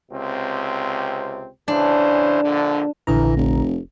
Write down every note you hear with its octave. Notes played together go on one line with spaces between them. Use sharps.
C#2 C3 C4
C#3 E3 D4 C5
A#1 D3
A#1 D3 E3 A#5
F1